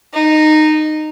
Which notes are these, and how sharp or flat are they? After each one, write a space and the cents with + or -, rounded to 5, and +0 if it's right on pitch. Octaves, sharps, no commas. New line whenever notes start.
D#4 -15